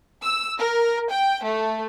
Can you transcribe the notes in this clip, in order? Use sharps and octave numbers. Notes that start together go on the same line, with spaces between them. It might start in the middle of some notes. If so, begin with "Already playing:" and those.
E6
A#4
G5
A3